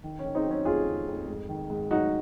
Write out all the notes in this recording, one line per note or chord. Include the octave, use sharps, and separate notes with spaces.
D#3
C#4
D#3
C4 D#4
F#3
C#4
F2 F4 G#4
F2
F2
G#2
D#3
G#2
F#3 D#4 F#4